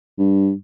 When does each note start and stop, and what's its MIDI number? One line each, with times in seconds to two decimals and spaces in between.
0.18 0.53 43